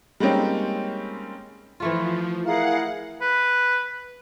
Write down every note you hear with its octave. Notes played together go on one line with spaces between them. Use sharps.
G3 G#3 A#3 C4 C#4 D#4
E3 F3 A3 F4
E4 G#4 A#4 F5 F#5
B4